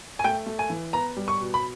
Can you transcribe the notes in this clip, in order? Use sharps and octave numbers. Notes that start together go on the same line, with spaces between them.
G#5
A3 G5
A3
G#5
E3
B3 A#5
G3
C#6
B2
B5